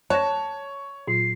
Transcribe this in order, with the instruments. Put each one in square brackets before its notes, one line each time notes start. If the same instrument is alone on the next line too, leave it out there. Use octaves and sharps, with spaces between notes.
[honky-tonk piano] C#5 [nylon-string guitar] A5 [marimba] F#6 A#6
[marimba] A#2 F#3 F4 [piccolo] C7